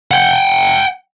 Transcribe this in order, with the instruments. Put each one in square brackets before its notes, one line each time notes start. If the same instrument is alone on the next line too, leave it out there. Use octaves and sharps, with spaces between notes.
[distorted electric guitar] F#5 G5